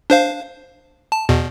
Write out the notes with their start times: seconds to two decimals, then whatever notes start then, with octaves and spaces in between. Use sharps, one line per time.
0.10 D4 C5 F5
1.12 A5
1.29 E2 B2